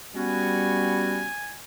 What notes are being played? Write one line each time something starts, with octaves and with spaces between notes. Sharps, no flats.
G3 B3 C#4 F#4 G#5